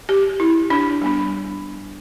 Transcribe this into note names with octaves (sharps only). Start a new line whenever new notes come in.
G4
E4
D4
G3 B3 D4